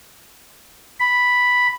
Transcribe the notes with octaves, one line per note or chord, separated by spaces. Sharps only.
B5